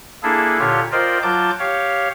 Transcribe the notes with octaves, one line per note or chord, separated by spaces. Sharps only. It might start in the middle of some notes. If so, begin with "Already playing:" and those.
A#3 D4 E4 G#4 A4
A#2 D3 F4 G4 C#5
F4 A#4 C5 D5 D#5 G5
F#3 F4 A5 D6 G6
G4 C#5 F5